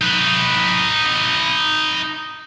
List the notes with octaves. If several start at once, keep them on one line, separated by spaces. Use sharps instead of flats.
D#4 B4